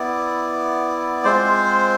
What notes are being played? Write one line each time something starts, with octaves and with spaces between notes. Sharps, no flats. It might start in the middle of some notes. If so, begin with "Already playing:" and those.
Already playing: B3 E4 D5
G#3 C4 F4 C5